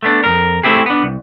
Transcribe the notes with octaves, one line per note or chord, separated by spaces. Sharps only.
A3 B3 D4
F2 G#2 A#4
A3 C4 E4 G4 G#4
B3 D4
C2